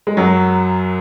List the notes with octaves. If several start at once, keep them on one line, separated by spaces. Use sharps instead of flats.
G#3
F#2 F#3